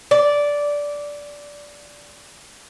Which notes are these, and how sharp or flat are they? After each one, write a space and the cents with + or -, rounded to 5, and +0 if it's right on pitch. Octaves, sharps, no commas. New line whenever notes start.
D5 -10